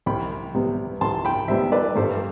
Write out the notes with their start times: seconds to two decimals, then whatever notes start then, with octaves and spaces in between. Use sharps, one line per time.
0.06 C2 G5 B5
0.54 C3 G3 B3
1.01 C2 A5 C6
1.25 G5 B5
1.48 C3 G3 B3 C5 E5
1.72 B4 D5
1.96 G2 A4 C5